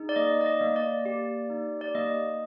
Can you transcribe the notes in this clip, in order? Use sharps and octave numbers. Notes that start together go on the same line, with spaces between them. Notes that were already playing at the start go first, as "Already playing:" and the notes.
Already playing: D#4 G#4
D5
A#3 D#5
D5
D#5
A#3
D5
G4
D#4
D5
A#3 D#5